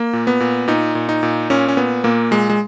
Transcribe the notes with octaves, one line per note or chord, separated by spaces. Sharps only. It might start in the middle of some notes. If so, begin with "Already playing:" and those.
Already playing: A#3
A#2
B3
A#2
A#2 D#4
A#2
D#4
A#2
A#2 C#4
C#4
A#2 B3
A#2 A#3
A#2 G#3
G#3